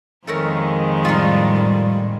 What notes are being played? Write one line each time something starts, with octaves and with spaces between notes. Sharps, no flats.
F2 D#3 G#3 A3 C#4 A#4
A2 G3 D#4 F4